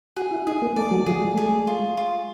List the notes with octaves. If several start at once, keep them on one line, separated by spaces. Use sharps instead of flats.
F#4 G#4
E4
D#4 G#4
A#3
A3 D5
F#3
F3 G#4
G#3
A3 G#4
G#3
F4
F4